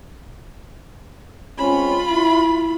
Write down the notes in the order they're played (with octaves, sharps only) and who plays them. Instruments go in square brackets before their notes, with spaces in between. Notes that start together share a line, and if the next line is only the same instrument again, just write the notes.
[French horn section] G#3 C4 C#4 [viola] F4 B5
[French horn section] E4